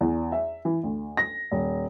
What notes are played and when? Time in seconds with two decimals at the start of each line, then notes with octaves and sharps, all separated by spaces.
0.01 E2
0.32 E5
0.65 E3
0.83 D2
1.17 A#6
1.51 D#1